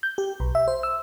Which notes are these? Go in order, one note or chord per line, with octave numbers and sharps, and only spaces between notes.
G6
G4
B1
E5
C5
E6